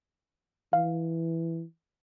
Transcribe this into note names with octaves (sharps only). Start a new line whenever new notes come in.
E3 F5